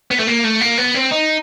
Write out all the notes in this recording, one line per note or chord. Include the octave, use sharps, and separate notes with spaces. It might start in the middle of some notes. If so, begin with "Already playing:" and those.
B3
A3
A#3
A3
A#3
B3
C4
D#4